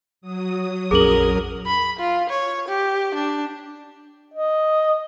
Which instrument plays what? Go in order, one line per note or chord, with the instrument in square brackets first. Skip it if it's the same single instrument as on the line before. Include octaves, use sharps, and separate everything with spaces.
[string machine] F#3 D#6
[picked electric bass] A#1 F2 C#4 [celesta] G#4 F#7 [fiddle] A#4
[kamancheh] B5
F4
C#5
G4
D4
[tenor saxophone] D#5